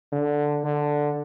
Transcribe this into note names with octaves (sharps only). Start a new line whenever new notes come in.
D3
D3